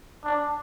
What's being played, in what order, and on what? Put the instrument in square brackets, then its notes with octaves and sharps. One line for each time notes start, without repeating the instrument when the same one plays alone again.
[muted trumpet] D4